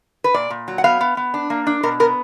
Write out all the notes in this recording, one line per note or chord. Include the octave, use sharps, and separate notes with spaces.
B4
A#2 D5
A#2
F#3
F#5
B3 F5
B3
B3
D4
A#3
D4
B2 A#4
B3 A#4